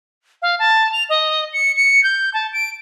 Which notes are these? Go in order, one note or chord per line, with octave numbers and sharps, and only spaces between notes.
F5
A5
F7
D#5
C#7
C#7
G6
A5
D7